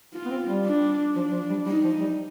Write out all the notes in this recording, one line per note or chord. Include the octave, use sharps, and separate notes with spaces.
F4
B3
C4
G3
D4
F3 D4
F3
G3
G3 D#4
F3
G3